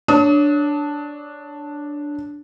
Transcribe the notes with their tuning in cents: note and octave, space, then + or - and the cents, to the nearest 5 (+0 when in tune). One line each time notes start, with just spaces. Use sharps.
D4 +0 C#5 +15 D#6 +40